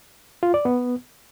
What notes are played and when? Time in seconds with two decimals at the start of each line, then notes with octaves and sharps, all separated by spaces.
0.43 F4
0.54 D5
0.65 B3